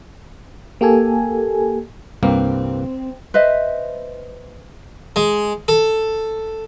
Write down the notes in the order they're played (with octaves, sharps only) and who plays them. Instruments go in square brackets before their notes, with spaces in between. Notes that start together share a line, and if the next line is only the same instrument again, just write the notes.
[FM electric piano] A#3 G4 A4 G#5
[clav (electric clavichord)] C2 G2 A#3 [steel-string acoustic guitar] C4
[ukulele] B4 C5 D#5 E5
[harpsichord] G#3
A4